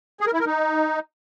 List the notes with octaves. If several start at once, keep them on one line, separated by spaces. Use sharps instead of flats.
G#4
A#4
E4
A#4
D#4